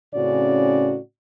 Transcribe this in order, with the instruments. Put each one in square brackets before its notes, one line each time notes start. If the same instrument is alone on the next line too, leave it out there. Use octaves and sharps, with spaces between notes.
[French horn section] A2 C#3 C4 C#4 F#4 D5